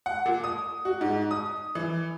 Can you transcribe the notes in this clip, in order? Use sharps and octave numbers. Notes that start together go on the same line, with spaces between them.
F#5
A#2
D#6
F#4
G#2
D#6
E3